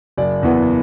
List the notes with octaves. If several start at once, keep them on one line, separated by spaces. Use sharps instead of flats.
F#1 D5
E2 E3 B3